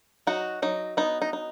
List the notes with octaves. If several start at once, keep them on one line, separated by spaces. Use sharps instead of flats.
F#3 D#4 F#4
F#3 D#4
B3 D#4
D#4
D#4